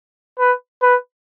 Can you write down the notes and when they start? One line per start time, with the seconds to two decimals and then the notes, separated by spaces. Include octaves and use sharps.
0.38 B4
0.82 B4